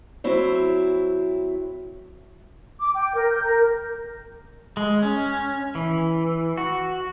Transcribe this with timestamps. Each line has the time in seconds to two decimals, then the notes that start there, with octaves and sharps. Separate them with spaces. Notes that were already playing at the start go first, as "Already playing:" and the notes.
0.24 F#3 C4 E4
2.79 D6
2.94 G5
3.14 A#4
3.29 G6
3.44 A#4
4.77 G#3
5.02 C#4
5.75 E3
6.58 F#4